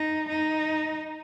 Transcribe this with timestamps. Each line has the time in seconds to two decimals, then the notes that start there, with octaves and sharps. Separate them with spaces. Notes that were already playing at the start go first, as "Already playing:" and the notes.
Already playing: D#4
0.29 D#4